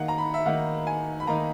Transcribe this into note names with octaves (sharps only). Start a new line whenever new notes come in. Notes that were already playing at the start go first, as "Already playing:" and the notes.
Already playing: D#3 A#3 D#4 F#5
A#5
B5
E5
D#3 A#3 D#4 F#5
G#5
B5
D#3 A#3 D#4 A#5